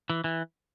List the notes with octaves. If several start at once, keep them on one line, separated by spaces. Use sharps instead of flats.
E3
E3